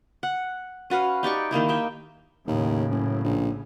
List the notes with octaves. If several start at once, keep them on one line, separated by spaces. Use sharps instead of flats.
F#5
C#4 F#4 B4 F5
D#4 G4 D5 C#6
D#3 A#3 D#4 E4
D#4 E5 G5
D#2 A2 C#3
F#1
A#1